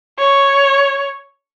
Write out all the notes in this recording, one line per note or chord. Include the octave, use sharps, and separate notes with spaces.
C#5